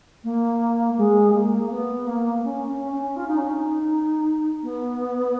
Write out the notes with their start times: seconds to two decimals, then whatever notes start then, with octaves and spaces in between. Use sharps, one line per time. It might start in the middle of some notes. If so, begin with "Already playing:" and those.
0.24 A#3
0.98 G#3
1.34 A#3
1.70 B3
2.07 A#3
2.44 C#4
2.67 C#4
2.91 C#4
3.16 F4
3.27 D#4
3.37 C#4
3.48 D#4
4.63 B3